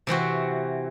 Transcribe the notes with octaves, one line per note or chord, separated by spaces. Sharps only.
C3 E3 C4 F#4